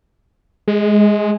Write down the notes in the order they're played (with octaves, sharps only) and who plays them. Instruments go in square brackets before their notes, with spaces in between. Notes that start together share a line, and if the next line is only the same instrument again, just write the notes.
[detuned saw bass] G#3